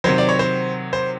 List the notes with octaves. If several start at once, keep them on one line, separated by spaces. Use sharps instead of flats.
C3 D#3 F#3 C5
D5
C#5
C5
C5